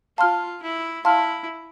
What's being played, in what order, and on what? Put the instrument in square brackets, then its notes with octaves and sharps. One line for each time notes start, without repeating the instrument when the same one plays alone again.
[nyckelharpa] F4 [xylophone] F5 A5 C6 F6
[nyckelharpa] E4
[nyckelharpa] E4 [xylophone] F5 A5 C6 F6